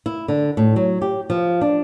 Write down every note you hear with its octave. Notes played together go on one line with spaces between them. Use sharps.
E4
D3
A2
F#3
G4
F3
D4